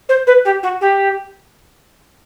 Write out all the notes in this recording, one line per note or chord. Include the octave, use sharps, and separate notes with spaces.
C5
B4
G4
F#4
G4